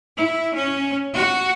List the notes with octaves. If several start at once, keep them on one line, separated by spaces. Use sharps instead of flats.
E4
C#4
F#4